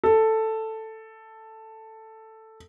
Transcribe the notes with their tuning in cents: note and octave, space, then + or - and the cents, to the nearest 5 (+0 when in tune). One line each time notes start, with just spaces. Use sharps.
A4 +5